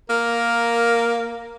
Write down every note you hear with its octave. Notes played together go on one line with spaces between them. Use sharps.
A#3 A#4